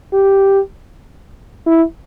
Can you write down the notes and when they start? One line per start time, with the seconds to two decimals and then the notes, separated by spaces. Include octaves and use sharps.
0.13 G4
1.66 E4